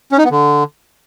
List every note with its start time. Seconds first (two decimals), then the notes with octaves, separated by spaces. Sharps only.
0.12 C#4
0.18 D#4
0.25 B3
0.31 D3